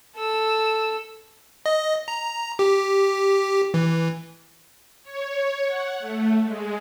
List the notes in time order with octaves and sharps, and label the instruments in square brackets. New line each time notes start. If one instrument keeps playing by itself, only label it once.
[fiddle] A4 E6
[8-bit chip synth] D#5
A#5
G4
E3
[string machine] C#5
F#5
A3
G#3